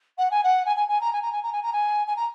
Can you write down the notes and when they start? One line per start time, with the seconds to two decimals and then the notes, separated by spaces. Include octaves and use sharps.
0.18 F#5
0.30 G#5
0.43 F#5
0.65 G#5
0.76 G#5
0.88 G#5
1.01 A#5
1.12 G#5
1.22 A#5
1.32 G#5
1.43 A#5
1.52 G#5
1.63 A#5
1.72 G#5
2.07 G#5
2.16 A#5